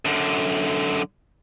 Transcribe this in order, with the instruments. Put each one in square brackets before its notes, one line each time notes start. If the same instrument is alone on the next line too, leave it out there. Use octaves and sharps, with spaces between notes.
[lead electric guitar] F#2 D3